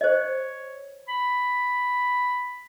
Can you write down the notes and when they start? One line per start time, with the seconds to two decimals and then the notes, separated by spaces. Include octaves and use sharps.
0.01 C5 C#5 D#5
1.09 B5